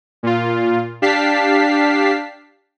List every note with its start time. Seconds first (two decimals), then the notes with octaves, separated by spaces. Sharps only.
0.23 A#2 F4
1.02 D4 G4 F5 A5 B6 C7